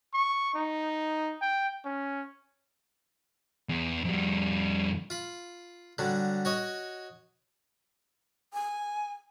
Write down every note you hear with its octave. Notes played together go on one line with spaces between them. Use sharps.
C#6
D#4
G5
C#4
E2
F2 G3
F4 B5
D3 F#3 G3
F#4 C#5 D#5
G#5